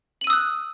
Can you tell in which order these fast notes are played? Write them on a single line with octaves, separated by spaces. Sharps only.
F#7 D#7 E6 D#6 F#6